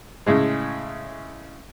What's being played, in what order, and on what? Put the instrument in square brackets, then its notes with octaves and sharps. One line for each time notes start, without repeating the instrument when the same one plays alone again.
[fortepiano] A2 C#3 G#3